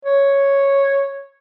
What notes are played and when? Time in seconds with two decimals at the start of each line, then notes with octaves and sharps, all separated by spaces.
0.05 C#5